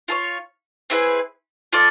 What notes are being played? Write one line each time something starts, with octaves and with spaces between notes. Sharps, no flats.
F4 A4 C#5
C4 E4 G#4 B4
F4 A4 D5